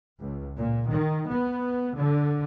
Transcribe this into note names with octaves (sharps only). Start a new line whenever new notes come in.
C#2
A#2
D#3
B3
D3